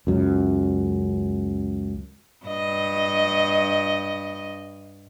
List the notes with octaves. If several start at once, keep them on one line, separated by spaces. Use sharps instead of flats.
C#2 F#2
G2 D#5